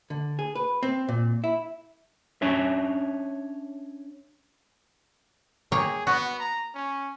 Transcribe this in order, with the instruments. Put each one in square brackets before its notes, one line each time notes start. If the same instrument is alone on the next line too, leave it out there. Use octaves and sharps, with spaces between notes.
[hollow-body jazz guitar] D3
G#4
B4
C4
A#2
E4
[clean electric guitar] C#4 D4 C#5 E5
[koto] A#3 C#5 G5 [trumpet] G#4
[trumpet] B3 [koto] F#4
[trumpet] A#5
C#4